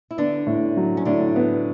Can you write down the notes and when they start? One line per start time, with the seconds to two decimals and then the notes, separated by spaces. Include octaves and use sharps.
0.11 E4
0.17 D3 B3 D4
0.47 A2
0.77 F#3
0.97 C#4
1.05 A2 D3 D4
1.36 B3